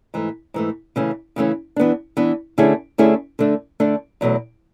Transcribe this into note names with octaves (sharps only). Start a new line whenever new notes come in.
G#2 E3 A3
G#2 E3 A3
C#3 E3 A3 C#4
C#3 E3 A3 C#4
E3 B3 D4
E3 B3 D4
D3 A3 C#4 E4 G#4
D3 A3 C#4 E4 G#4
D3 A3 D4
D3 A3 D4
E2 B2 F#3 A3